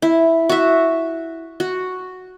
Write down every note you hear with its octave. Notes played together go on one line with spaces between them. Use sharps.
E4
F#4 E5
F#4